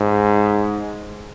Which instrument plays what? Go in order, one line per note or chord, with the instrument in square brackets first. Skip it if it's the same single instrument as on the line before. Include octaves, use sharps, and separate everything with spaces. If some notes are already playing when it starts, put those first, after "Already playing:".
Already playing: [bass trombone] G#2